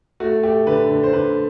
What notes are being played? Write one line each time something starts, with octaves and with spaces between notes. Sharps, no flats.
A3 F#4
A3 G4
D3 B4
D3
C5
D3 B4